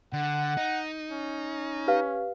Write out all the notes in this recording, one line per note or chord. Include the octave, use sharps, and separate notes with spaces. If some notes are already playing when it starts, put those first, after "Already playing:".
D3 F#5
D#4
C#4
G4 B4 F5